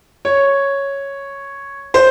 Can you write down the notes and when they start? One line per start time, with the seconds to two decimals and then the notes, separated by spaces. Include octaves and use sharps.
0.25 C#5
1.94 C5